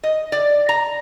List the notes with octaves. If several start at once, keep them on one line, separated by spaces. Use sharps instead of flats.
D#5
D5
A#5